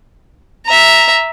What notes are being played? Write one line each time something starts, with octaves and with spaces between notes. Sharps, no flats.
E5 A#5